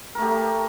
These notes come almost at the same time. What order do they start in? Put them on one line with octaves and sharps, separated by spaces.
A#4 A3 G4